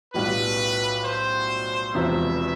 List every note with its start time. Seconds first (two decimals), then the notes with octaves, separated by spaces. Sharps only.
0.14 B1 A2 G3 B3 F4 B4
1.05 C5
1.95 E1 E2 C3 F3 C4 E5